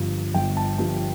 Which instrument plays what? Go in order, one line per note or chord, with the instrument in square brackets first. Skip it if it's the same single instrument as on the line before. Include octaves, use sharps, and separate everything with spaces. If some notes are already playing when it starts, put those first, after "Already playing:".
Already playing: [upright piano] G1 G2 F3
G1 G5
A5
G2 F3 A5